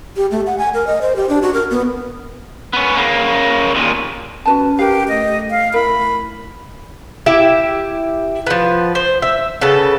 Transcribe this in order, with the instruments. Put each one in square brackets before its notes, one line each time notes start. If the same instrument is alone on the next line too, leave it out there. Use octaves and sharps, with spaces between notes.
[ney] G4
A3
F#5
G#5
A#4
D#5
C5
G4
D4
F#4
A#4
B3
[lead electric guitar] B3 C#4
C#3 A#3
D#2 A#2
[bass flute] C#4 [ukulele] F#4 B4 A5
[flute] G4 [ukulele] A#4 B4 F5
[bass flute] A3 [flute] D#5
[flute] F5
[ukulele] E4 A#4 [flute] B5
[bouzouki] E4 G4 E5
F3 B3
C5
E5
C#3 B3 A4